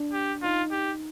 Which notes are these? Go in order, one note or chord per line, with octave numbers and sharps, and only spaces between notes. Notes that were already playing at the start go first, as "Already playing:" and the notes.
Already playing: D4
G4
D#4 F4
G4